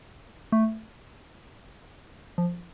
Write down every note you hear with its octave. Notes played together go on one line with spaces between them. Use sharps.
A3
F3